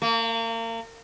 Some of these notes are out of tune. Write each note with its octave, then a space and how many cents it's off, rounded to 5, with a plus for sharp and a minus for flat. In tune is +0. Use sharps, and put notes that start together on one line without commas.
A#3 -35